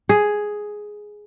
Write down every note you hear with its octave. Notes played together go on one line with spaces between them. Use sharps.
G#4